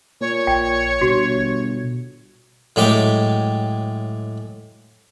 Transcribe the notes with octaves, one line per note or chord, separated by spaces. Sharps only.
A#2 C#5
A#1 G5
G1 B2 F#4
A2 F#3 G#3 G4 G5 D6